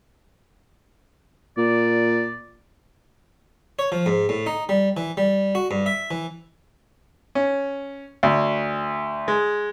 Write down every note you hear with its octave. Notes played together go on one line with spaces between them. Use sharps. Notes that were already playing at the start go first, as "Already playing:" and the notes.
A#2 D5
C#5
F3
G#2
A2
D#4
G3
E3
G3
F#4
G2
E5
E3
C#4
D2
G#3